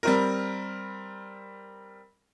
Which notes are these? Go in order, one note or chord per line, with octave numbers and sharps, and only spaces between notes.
G3 C4 A#4